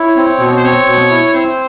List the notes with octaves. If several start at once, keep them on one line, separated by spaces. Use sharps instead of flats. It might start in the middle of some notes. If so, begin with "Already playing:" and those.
Already playing: E4 C#5
C4
B2
C5
C4 C#5
B2
E4
C4 C5